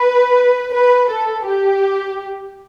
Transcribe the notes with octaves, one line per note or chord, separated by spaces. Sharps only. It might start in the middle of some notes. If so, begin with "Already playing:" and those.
Already playing: B4
B4
A4
G4